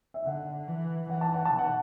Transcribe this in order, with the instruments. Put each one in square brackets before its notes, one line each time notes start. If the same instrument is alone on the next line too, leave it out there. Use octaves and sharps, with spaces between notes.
[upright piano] E5
[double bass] D3 [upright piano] F#5
[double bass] E3
[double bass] E3 [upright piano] F#5
[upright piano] A5
F#5
A5
[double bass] B2
[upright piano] F#5